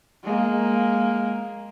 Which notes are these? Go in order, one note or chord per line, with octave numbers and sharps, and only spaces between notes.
G#3 A#3